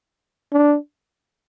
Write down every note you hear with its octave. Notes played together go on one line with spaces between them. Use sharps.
D4